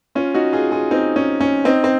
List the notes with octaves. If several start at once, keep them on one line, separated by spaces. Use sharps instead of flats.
C#4 F4
D#4 F#4
F4 G#4
F4 G#4
C4 D#4
C#4
C#4
C4 D#4
C4